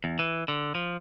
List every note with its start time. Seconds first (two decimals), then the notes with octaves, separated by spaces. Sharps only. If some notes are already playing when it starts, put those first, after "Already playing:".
0.04 E2
0.19 E3
0.48 D3
0.75 F3